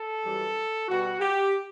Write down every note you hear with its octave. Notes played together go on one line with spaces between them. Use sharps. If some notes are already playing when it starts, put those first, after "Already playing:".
Already playing: A4
F#2 E3 G3
B2 G3 F#4
G4